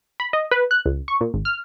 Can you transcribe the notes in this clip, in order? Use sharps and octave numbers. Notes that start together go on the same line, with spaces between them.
B5
D#5
B4
F#6
C#2
C#6
A#2
G#1
F6